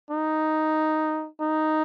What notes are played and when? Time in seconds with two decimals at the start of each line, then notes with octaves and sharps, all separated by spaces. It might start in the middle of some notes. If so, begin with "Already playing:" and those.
0.11 D#4
1.41 D#4